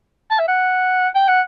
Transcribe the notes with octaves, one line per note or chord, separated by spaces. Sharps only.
A5
E5
F#5
G5
F#5